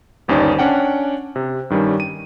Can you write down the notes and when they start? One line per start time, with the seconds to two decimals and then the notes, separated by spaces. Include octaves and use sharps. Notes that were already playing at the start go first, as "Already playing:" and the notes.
0.28 G1 D#2 C#4 D#4 C5 D5
0.59 C#4 D4 F#5 G5
1.36 C3
1.70 G2 D#3 G3 C#4
2.00 D#7